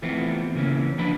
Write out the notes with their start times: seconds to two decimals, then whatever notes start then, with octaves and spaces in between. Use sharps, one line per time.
0.02 E3 F3 A3 B3 C4
0.55 C#3 E3 A#3 C#4
0.98 D3 F3 B3 D4 B4 B5